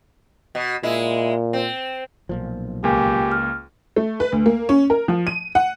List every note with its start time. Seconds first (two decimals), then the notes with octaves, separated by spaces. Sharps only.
0.55 B2
0.83 A#2 G#3 E4
1.53 C4
2.29 B1 A#2 F3
2.84 C#2 A#3 G4 G#5
3.32 F6
3.96 A3
4.20 B4
4.32 D2
4.46 A#3
4.69 C#4
4.90 A#4
5.08 F3
5.27 D#7
5.55 F#5